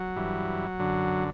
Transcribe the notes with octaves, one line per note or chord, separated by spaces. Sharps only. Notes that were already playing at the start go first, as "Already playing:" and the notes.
Already playing: F#3
G2 E3
F#2 D3